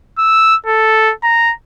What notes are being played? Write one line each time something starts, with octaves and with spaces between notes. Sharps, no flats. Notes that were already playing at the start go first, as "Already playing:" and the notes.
E6
A4
A#5